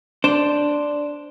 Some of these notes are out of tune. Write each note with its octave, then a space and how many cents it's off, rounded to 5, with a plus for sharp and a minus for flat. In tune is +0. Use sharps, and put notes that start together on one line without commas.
D4 +0 C5 -5